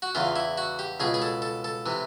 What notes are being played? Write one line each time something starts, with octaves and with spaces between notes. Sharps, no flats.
F#4
E2 C#3 E3 F4
E4
F#4
G4
C#2 B2 G#4
G#4
A4
A4
A4
C3 E3